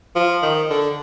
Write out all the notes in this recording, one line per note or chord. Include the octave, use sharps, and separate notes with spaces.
F3
D#3
D3